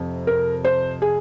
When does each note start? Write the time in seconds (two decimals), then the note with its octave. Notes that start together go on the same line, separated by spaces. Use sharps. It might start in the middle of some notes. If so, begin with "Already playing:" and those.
Already playing: F2 C3
0.27 A#4
0.65 C5
1.02 G#4